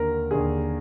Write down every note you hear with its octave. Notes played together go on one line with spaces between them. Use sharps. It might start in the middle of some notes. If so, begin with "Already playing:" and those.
Already playing: D#2 D3 A#4
D#2 D3 G#4